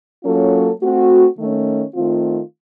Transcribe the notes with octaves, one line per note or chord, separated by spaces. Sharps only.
F#3 A#3 C#4 F4 A4
A3 C4 F#4
D#3 A3 C#4
D#3 A3 C4 F4